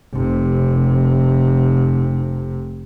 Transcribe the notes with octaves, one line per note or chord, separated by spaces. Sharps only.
F1 C3